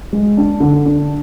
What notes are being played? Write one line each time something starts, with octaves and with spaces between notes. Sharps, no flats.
G#3
D4
D3
D4